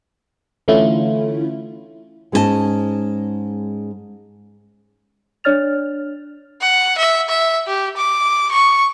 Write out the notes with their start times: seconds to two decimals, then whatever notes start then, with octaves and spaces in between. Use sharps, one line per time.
0.68 D3 E3 A3 C#4 E4 F4
2.32 G#2 G#3 C#4 D#4 D#5 A5
5.44 D4 C#5 D5 F6 A6 F7
6.61 F#5
6.98 E5
7.29 E5
7.67 G4
7.97 D6
8.52 C#6